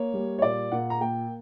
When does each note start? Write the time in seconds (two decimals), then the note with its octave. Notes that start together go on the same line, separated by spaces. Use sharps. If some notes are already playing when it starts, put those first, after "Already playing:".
Already playing: A#3 C#5
0.14 G3
0.39 C#5
0.42 A#2 D5
0.72 A#2 F#5
0.90 A#5
1.00 A#3 G5